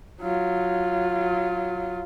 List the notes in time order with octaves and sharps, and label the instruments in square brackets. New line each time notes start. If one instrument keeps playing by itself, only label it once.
[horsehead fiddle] F#3 F4